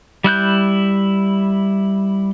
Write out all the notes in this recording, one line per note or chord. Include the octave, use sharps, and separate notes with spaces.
G3 E4 F#6 G6